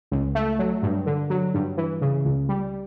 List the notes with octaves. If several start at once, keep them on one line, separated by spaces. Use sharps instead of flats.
C#2
A3
F#3
G2
D3
F#3
G2
E3
C#3
C#2
G3